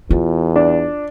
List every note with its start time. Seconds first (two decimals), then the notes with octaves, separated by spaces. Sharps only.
0.10 E2 F4
0.56 D4